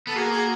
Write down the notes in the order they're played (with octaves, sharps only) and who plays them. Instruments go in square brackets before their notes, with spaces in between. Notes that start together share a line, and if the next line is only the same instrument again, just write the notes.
[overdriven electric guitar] B3 [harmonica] A4
[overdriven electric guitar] A#3 [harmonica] F#4 G#4
[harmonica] F#4 G#4